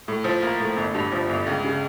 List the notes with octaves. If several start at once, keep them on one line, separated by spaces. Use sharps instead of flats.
A2
F3
A#3
A2
G1
G2
F3
G1
C#2
C#3